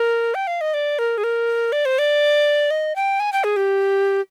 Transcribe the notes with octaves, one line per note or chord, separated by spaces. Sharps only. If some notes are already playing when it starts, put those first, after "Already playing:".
Already playing: A#4
G5
F5
D#5
D5
A#4
G#4
A#4
D5
C5
D5
D#5
G5
G#5
G5
G#4
G4